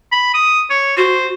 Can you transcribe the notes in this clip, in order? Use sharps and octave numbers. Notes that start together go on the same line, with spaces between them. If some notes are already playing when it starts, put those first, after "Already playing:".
B5
D#6
C#5
F#4 C5